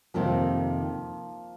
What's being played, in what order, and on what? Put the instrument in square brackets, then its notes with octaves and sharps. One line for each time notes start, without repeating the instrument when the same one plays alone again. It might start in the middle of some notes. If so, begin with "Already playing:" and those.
[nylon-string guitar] F2 C3 D#3 C4 [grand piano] F3 A#3